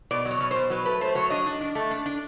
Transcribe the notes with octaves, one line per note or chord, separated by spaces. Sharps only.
B2 D5
F#3
C#5
B2
B2 C5
F#3 B4
A3 B4
A3 C5
F#3 C#5
D4 D#5
D4
D4
A3
D4
D4